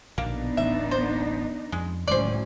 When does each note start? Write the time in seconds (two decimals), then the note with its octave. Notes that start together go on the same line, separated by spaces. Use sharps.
0.18 A#1 B2 D3 A#3 B3 D4 D#4
0.57 D1 A1 E5
0.91 C5
1.72 F2 G#3
2.08 D1 C#2 A2 D#3 F#3 C#4 C5 D5